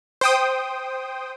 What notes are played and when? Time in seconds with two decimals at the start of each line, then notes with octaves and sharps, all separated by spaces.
0.21 C5 G5 D#6